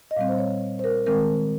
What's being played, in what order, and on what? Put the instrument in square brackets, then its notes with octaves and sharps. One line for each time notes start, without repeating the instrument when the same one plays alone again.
[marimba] D#5
A#2 G3 C4 F5
C5
C#5
C5
A#4
D#3 G#3 C4 A#4